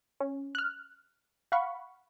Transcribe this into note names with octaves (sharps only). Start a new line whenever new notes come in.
C#4
F6 F#6
F5 F#5 B5 C#6